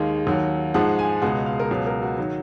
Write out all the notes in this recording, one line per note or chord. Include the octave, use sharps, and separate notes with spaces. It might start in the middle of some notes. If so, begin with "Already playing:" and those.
Already playing: D#2 D#3 G#3 F5
D#2 D#3 F#3
G#2 F3 G#3 F#5
G#5
C#2 B2 G#3 F#5
F5
A#4
C#2 B2 F#3 B4
A#4
F#4
D#3 F#3